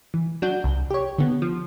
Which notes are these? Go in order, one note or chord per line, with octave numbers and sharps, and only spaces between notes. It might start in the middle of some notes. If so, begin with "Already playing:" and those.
E3
F#3 D4 F#4 G6
C2
G4 C#5
D3 B3
F3